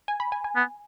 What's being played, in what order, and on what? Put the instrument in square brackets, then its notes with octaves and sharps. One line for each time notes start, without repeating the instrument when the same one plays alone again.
[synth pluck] G#5
B5
G#5
G#5
[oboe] B3